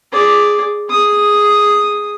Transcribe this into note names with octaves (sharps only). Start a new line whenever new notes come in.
G#4 D5
G#4 D#6